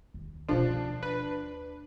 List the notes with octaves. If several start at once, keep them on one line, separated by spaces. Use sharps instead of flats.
D#2
B2 F3 A3 D4
D#2
B4